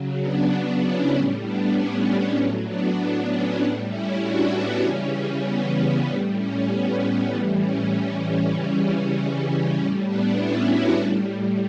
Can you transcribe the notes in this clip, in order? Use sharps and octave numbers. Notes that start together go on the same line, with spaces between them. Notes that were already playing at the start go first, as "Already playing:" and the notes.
Already playing: C#3 F#3
B3 D4
B3 D4
C#4 E4
A2 G3 C#4
B3 D4
C#4
C#4
A2 F#3 C#4
B3 D4
C#4
A2 G3 B3 D4
C#4 E4
D4 F#4
B3 D4
C#3 E3 G3 C#4
B3
C#4
A2 G3 B3 D4
C#4
B3
C#4
A2 E3 G3 B3
C#4
C#4
C#4
C#3 E3 G3
A2 G3 C#4
B3 D4
C#4 E4
D4 F#4
A2 G3